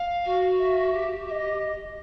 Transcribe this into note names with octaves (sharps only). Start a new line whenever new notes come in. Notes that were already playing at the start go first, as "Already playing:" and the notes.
Already playing: F5
F#4
E5
G4
E5
D#5